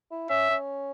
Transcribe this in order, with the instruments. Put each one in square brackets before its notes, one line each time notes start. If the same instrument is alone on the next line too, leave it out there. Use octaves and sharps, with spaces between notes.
[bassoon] E4
[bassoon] C#4 [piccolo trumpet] E5
[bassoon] C#4